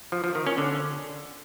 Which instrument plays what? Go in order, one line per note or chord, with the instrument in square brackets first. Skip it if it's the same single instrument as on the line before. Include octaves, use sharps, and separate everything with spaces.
[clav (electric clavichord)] F3
F3
D#3
C#4
D3